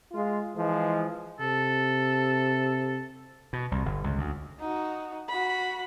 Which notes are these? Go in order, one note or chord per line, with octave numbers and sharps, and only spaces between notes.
G#3 F4
E3 F3 G#3
C3 A4
B2
C2
G1
C#2
D2
D#4 F#4
F#4 B5